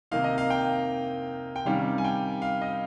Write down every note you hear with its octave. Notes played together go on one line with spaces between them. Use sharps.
C3 D#3 A#3 D#4 F5
D#5
F5
G5
G5
C3 D#3 G3 C#4 F5
G#5
G5
F5
D#5